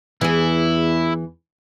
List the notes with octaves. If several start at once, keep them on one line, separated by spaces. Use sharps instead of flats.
E2 E3 E4 G#4